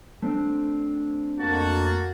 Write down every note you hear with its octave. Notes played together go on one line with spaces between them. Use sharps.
A3 C4 D4
F2 A#3 F#4 A5